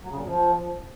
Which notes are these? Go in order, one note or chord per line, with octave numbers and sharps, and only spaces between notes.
F#3
C#3
A#2
F#2
F3